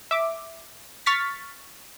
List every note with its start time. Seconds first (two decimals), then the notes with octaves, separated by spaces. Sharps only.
0.11 E5 D6
1.06 C#6 F6 A6 B6